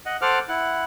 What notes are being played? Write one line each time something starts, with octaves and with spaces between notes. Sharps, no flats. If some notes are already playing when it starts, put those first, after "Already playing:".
D#5 F#5
A4 C5 F#5 D6 F6
E4 F#5